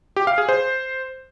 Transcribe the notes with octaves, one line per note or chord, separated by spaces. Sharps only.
G4
F5
G#4
C5